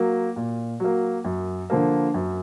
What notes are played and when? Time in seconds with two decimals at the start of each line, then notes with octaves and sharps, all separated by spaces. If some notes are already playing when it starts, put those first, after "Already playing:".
Already playing: F#3 A#3
0.36 A#2
0.80 F#3 A#3
1.24 F#2
1.70 D3 F3 A#3
2.14 F#2